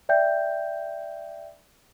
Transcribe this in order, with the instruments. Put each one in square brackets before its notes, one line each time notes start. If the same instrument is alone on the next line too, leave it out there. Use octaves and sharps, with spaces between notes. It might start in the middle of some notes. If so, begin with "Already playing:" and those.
[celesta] D5 E5 G5 G6